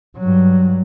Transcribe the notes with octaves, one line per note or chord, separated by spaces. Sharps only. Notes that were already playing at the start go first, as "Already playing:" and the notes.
G2 F#3